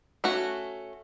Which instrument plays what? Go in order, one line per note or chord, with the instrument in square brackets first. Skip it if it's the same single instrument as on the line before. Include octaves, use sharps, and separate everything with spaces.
[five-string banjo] A3 C#4 F#4